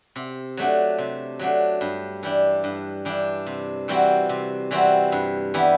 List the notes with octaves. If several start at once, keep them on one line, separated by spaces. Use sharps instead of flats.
C3
F#3 A3 D4
C3
F#3 A3 D4
G2
E3 G3 D4
G2
E3 G3 D4
C3
E3 G3 C4 F#4
C3
E3 G3 C4 F#4
G2
E3 G3 B3